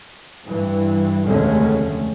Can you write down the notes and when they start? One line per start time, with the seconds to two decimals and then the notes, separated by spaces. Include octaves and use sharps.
0.44 G2 E3
1.24 F1 D#2 D3 G#3 A3 C#4